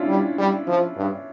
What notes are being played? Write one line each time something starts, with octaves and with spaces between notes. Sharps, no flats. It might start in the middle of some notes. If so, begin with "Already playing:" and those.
Already playing: C#4 D4 E4 F4
G3
G3
F3
G2